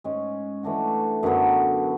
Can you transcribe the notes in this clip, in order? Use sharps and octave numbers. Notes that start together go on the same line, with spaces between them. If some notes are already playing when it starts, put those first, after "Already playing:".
G#2 G#3 C#4
E3 A3 D4 F#4
F#2 D3 F#3 B3